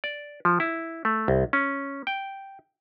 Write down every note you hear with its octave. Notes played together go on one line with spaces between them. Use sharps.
D5
F3
E4
A3
C2
C#4
G5